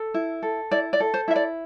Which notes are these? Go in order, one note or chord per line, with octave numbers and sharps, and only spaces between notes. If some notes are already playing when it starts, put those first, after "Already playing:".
Already playing: A4
E4
A4
E4 D5
D5
A4
C5
E4 E5
D5